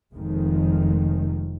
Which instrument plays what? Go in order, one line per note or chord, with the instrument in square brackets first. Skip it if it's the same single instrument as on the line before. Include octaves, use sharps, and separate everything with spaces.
[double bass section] F1 F2 D#3 G#3